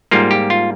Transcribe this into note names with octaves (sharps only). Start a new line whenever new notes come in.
G#2 G3 A#3 F4
G4
F4